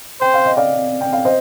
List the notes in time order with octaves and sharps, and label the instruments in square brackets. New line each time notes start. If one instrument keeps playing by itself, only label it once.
[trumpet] C5 [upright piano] G5
[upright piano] F5
D#5
D5 F5
G5
F5
C5 D#5